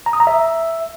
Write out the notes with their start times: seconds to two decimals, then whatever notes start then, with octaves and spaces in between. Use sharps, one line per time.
0.06 A#5
0.13 D#6
0.20 A#5
0.27 E5